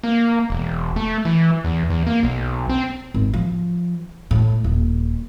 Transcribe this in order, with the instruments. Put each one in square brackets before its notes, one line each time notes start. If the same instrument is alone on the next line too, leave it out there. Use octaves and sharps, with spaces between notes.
[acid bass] A#3
E1
A3
E3
E2
E2
A#3
B1
C4
[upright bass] G#1
F3
A2
D#1